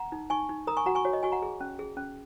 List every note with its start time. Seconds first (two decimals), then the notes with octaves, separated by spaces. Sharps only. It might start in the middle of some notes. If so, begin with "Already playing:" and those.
Already playing: F#5 A#5
0.12 D#4
0.30 D#4 G#5 C#6
0.49 D#4
0.67 A#4 A#5 D#6
0.77 G#5 C#6
0.86 F#4 F#5 A#5
0.95 G#5 C#6
1.05 F#4 C#5
1.13 D#5
1.23 F#4 G#5 C#6
1.32 F#5 A#5
1.42 G#4
1.61 C#4
1.79 G#4
1.97 C#4